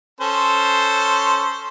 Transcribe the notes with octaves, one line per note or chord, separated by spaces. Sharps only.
C#4 A4 C5